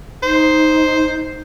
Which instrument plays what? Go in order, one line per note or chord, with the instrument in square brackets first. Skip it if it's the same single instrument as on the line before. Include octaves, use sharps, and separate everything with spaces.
[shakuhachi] D#4 [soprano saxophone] C5